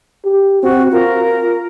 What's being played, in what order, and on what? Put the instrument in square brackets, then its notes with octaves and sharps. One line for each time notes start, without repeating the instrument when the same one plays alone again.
[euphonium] G4
[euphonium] C4 [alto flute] F#4
[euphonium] F4 [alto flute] A#4